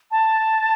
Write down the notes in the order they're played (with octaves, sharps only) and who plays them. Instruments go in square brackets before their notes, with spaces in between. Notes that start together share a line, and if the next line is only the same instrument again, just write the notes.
[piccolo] A5